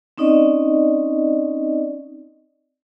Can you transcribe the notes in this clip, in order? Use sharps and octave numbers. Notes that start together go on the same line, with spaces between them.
C4 C#4 D#4 D5 D#5